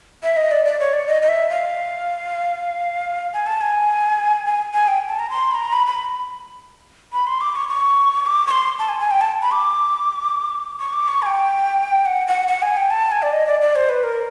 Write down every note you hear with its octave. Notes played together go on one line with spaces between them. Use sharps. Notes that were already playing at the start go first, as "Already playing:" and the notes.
E5
D#5
D5
D5
C#5
D5
D#5
D#5
E5
F5
G#5
A5
G#5
G#5
G#5
G5
A5
A#5
C6
B5
A#5
B5
B5
B5
C6
D6
C#6
C#6
D6
C#6
C6
A5
G#5
G#5
G5
A5
B5
D6
C#6
D6
C#6
G#5
G5
F#5
F#5
F#5
G#5
G5
A5
G#5
D5
D#5
D5
D5
C5
B4
A#4